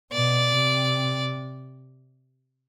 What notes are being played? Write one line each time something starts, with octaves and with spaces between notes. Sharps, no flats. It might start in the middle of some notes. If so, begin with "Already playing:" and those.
B2 D5
C3